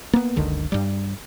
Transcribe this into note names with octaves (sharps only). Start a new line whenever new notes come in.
A#3 B3
F#1 C#2 D3 D#3
G2 G3